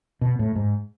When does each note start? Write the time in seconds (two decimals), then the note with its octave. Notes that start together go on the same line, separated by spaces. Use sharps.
0.21 B2
0.39 A2
0.56 G#2